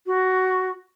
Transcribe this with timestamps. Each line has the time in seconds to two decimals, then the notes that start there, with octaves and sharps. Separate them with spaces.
0.06 F#4